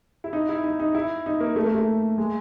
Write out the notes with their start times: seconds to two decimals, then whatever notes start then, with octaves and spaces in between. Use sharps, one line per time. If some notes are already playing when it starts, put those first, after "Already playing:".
0.24 E4
0.33 D#4
0.49 E4
0.64 D#4
0.80 D#4
0.95 E4
1.26 D#4
1.41 A#3
1.56 A3
1.65 A#3
1.75 A3
2.18 G#3